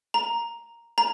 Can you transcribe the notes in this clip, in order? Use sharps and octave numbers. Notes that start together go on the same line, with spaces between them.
A#5
A#5